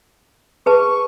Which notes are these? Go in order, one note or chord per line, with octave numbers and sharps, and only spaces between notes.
G#4 B4 A5 C#6